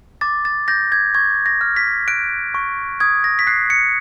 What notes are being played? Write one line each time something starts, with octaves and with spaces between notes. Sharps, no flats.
D6 A6
A6
G6 A#6
G#6
C#6 G#6
A#6
F6
B6
F#6 D7
C#6
D#6 G#6
A#6
B6
F#6 C7
C#7